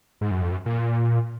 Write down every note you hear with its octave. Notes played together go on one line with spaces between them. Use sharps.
G#2
F#2
F2
F#2
A#2